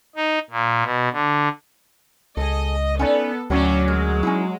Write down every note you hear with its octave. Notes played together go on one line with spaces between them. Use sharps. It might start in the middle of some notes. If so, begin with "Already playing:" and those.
D#4
A#2
B2
D3
C#2 G#4 A4 D#5
B3 C#4 D#4 A4 D5
D2 A2 F#3 C#4 C#5 D5 A#5
G#3 A#4
C#4 D#4 E4